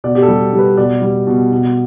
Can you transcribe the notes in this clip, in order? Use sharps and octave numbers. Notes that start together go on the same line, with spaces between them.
B2 D5
G4
A4
G3
G3
B4
B2 D5
G3
B2
B2